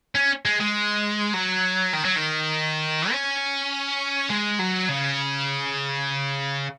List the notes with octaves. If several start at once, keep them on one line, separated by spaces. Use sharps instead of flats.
C#4
G#3
G#3
F#3
D#3
F#3
D#3
C#4
G#3
F#3
C#3